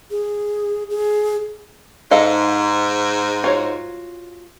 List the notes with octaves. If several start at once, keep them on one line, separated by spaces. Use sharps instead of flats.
G#4
G#4
G#2 A4 D#5 F5
F4 F#4 C#5